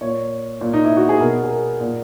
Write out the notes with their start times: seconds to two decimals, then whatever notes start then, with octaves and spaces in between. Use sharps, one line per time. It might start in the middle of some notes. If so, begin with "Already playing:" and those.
0.01 A#2 C#5
0.61 A#2
0.73 D#4
0.84 E4
0.97 F#4
1.09 G#4
1.20 B2 A#4
1.43 G#4
1.50 A#4
1.81 A#2